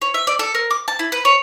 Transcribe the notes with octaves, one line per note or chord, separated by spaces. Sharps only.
C#5
E5
D5
A4
A#4
D6
A5
E4
B4
C#5